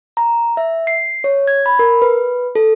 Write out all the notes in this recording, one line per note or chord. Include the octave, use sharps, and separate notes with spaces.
A#5
E5
C7
C#5
G#6
B5
A#4
B4
A4